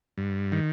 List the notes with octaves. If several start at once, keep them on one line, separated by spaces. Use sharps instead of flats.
G2
D#3